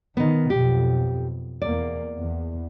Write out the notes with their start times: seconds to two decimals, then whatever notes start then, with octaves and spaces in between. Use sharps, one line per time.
0.17 D#3 B3 D#4
0.50 B1 F2 G4
1.62 E2 A#3 D5
2.17 E2